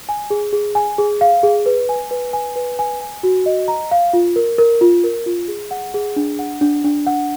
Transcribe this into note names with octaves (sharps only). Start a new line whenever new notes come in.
G#5
G#4
G#4
G#5
G#4
F5
G#4
B4
G#5
B4
G#5
B4
G#5
G#5
F#4
D#5
A#5
F5
F4
A#4
A#4
F4
A#4
F4
G#4
F#5
G#4
D4
F#5
D4
D4
F#5